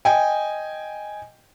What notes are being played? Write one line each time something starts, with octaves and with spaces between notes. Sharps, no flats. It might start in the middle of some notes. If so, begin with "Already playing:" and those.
D#5 G5 G#5